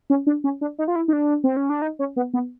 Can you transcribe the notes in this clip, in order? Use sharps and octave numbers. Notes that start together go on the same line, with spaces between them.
C#4
D4
C#4
D4
D#4
F4
E4
D#4
D4
C4
C#4
D4
D#4
C#4
B3
B3